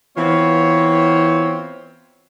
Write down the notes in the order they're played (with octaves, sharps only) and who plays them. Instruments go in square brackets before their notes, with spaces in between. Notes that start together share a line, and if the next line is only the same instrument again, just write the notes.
[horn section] E3 B3 C4 F4 C#5